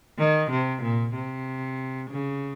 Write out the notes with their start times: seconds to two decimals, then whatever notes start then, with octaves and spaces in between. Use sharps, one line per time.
0.19 D#3
0.51 C3
0.82 A#2
1.15 C3
2.11 C#3